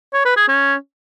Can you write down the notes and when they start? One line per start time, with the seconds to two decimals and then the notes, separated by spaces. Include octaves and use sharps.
0.13 C#5
0.25 B4
0.37 G#4
0.48 C#4